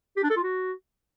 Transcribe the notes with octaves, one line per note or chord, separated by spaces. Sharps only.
G4
D4
A4
F4
F#4